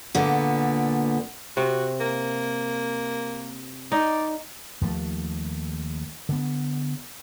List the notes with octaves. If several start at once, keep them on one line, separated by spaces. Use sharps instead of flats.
A#2 D3 B3
C3 F#4
A#3
D#4 D5
D#2 F3 F#3 A3
D3 B3